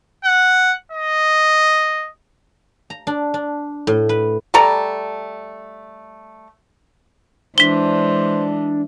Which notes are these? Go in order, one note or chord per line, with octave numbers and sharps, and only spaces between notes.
F#5
D#5
A#5
D4
D4
A2
B4
G3 A3 A4 A#5
E3 G#3 D4 C5 B6 G7